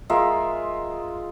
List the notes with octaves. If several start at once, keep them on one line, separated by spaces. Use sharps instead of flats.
G#3 F4 A#4 E5